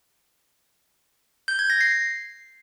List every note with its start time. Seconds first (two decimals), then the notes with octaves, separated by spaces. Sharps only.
1.48 G6
1.59 G#6
1.70 A#6
1.81 C7